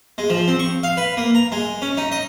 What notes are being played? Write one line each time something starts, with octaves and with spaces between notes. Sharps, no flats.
G#3
F3
C4
C#6
F5
B4
A#3
A#5
G#3
C#4
D#4
D#5